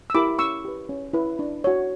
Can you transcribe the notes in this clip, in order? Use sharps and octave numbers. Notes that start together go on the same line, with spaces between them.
E6
E4 G4 A#4 B5 D6
C#4 C#6 E6
G4 B4
C#4
E4 B4
D4
F#4 C#5